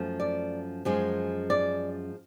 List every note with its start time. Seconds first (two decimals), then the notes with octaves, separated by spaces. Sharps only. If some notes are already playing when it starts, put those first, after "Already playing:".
Already playing: F#2 F3 A3
0.20 D5
0.85 F#2 F3 G#3
1.50 D5